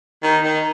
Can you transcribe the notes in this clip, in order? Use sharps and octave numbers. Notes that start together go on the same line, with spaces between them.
D#3
D#3